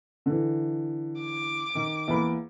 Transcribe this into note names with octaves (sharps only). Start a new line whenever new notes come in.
D3 E3
D6
D#3
E2 A#3 B5